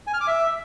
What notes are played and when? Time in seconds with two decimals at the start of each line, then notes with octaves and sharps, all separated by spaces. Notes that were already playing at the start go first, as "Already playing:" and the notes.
0.07 G#5
0.14 F6
0.21 D6
0.27 E5